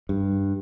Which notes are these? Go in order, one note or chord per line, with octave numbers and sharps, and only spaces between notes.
G2